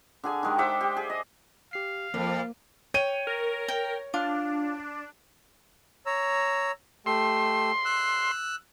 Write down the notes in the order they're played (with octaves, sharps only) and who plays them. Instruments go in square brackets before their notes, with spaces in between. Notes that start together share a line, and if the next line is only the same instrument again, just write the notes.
[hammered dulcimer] D3 G#4 G#5
D#3 G#3 G4
C5 E5 F#5 D6
G4
G#4
D#5
[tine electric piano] G4 C7 [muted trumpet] F5
[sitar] F2 [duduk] F3 [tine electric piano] A#3
[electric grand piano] C#5 D#7 [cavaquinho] G5
[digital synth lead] A#4
[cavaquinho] G5
[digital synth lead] D4 [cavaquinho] F4
[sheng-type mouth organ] C#5 A#5 E6
[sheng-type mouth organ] A3 G4 E6 [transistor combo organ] C6
[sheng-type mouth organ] E6 F#6